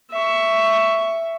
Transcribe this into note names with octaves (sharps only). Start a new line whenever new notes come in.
E5 C#6